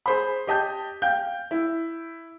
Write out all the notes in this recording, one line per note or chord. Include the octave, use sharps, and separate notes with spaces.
G#4 C5 B5
G4 D#5 A5 G6
F5 G5 G6
E4